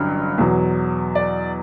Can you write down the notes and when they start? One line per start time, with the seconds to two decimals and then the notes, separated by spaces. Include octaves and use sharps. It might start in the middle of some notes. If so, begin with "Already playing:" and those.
Already playing: A1 G2 D3 F#3
0.38 E2 B2 F#3
1.15 D5